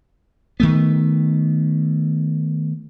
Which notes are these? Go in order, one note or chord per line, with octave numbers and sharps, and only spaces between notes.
D#3 A3 B3